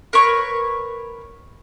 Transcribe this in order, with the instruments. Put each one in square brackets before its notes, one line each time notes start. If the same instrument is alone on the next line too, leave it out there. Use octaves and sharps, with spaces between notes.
[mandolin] A#4 B4 C#5 C#6